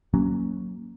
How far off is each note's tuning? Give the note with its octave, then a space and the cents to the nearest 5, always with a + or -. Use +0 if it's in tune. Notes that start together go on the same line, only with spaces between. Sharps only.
F#3 +0 A#3 +0 C#4 +0